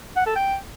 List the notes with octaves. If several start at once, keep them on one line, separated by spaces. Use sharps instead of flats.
F#5
A4
G5